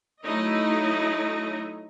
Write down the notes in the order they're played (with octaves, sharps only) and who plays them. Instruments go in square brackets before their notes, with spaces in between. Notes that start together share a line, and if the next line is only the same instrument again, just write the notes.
[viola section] F#3 A3 D#4 E4 C#5 D#5